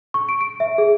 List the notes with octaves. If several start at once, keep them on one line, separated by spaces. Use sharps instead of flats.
C#6
D7
D7
E5
G#4